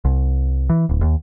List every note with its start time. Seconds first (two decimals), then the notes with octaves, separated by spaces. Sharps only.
0.05 C2
0.70 E3
0.89 D1
1.01 D#2